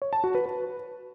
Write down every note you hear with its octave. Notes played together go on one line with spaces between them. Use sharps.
C#5
A5
F#4
B4
B4